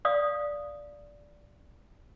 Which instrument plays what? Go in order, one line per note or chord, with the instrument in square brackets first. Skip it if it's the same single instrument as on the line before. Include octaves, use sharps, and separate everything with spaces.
[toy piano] D5 F5 D#6